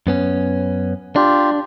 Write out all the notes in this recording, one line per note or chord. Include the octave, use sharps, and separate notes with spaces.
F#2 B3 C#4
D4 F4 G4